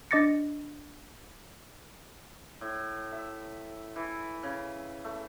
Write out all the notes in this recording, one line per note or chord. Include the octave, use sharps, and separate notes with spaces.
D4 D#5 D6 A6 A#6 C#7
A2
E5
E3
C#3
A3